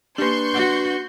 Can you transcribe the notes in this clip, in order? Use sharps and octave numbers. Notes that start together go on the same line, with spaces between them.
A#3 D4 G4 B4 C6 C#6 G6
F#4 F#5